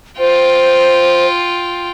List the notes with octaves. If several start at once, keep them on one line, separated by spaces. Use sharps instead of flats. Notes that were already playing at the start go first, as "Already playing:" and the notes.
F4 C5 G5